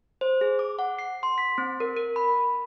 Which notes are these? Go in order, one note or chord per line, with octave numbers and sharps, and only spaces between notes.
C5
G#4
D6
F#5
C7
C6
B6
C4
A#4
A#4
B5